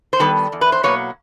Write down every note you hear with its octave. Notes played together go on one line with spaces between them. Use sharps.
C5
D#3 G3 B3 A4 B4
E2
B4
C5
B2 F#3 A#3 B4 C#5